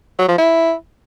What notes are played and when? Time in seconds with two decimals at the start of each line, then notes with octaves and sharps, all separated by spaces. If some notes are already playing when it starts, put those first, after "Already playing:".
0.19 F#3
0.28 F3
0.38 E4